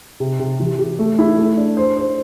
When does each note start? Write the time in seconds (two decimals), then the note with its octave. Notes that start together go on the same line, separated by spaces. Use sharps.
0.20 C3
0.39 C3
0.59 E3
0.79 G4
0.99 A3
1.19 E4
1.38 A3
1.57 D4
1.77 C5
1.97 C5